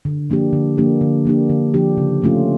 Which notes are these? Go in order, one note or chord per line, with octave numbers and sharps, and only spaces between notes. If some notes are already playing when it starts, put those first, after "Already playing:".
D3
F3 A#3 D4 G4
D3
F3 A#3 D4 G4
D3
F3 A#3 D4 G4
D3
F3 A#3 D4 G4
C#3
F3 A3 C#4 F4